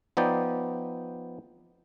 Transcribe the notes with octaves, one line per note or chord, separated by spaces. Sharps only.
F3 B3 D#4 D5 G5